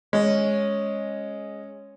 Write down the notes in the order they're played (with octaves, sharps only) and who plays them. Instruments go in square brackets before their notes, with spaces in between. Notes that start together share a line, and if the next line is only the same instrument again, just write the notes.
[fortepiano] G#3 [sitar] C#4